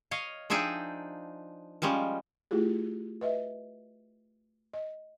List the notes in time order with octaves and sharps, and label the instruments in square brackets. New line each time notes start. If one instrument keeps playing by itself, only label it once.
[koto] C#5 D#5 F5
F3 D4 D#4 G#4 E5 G5
F3 G3 G#3 C#4
[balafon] A3 E4 F4 G4 G#4
B4 D#5 E5
D#5